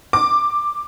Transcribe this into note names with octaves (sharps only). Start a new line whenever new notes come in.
D6